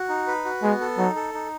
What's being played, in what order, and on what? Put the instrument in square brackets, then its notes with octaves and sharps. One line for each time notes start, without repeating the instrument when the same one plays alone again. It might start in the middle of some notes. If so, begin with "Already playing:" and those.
Already playing: [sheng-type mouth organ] F#4
D#4
B4
F#4
[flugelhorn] G#3 [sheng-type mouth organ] B3
[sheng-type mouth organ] A4
[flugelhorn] F#3 [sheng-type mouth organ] D#4
[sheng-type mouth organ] A4
D#4